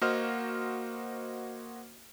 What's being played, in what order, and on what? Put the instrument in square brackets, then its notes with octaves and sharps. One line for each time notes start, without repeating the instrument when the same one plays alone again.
[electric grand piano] A#3 F#4 C5 D#5 F6